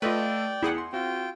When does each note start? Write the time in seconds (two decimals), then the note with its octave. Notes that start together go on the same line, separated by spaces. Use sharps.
0.02 A3 F4 A4 B4 D5 D#5 G5
0.63 E2 E4 G#4 F#5
0.78 C6
0.93 C4 F4 F#4 G5